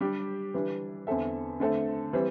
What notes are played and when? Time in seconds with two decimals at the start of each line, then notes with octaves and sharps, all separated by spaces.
0.01 G3 D4 G4
0.54 E3 G3 D4
1.07 E2 D3 C4 A4 E5
1.60 D3 A3 C4 A4
2.13 E3 G3 C4